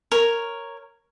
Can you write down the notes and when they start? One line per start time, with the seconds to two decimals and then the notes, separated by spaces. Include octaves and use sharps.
0.12 A#4 C#5